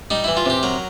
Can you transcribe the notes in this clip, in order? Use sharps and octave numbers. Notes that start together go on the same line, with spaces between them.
G3 D#4
E3 E4
F4
C3 G4
F#3 A#4